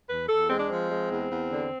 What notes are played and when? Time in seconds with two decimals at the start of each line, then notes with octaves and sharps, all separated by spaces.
0.09 E2 B4
0.29 E2 A4
0.49 G#3 C4
0.59 D4
0.69 F3 C4
0.90 G#3
1.10 E2
1.30 E2
1.51 D3